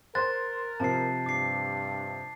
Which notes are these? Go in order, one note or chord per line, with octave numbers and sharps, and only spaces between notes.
A#4 C5 C6 F#6 A6
C3 F3 A5 C7
G2 D6 C7